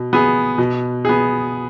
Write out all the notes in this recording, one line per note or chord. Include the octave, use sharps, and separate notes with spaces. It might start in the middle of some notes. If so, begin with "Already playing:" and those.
Already playing: B2
B3 G#4
B2
B3 G#4